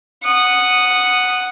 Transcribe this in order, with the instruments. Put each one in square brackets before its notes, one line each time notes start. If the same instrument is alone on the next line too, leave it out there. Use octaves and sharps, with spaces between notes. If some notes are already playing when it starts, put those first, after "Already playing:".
[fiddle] F#5 D#6